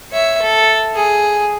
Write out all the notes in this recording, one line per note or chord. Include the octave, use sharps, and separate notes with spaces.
C#5 E5
A4
G#4